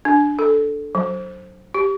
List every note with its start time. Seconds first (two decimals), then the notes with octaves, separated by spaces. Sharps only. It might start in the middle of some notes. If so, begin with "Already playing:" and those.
0.05 D4
0.39 A4
0.95 F#3
1.74 G4